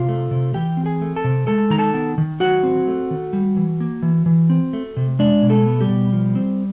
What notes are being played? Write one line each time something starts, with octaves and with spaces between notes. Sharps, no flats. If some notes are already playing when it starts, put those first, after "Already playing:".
Already playing: C3 F4 F5
A3
C3
E3 G4 G5
C4
G#4 G#5
A3
A4 A5
C3
G#3 A4 A5
D#3 A#5
A4 A5
B3
D#3
F#3 F#4 F#5
C4
A3
D#3
G3
E3
A#3
E3
E3
C4
A3
C3
G#3 D4 D5
B2
A3 A4
B3
G3 G4
B2
F3
C4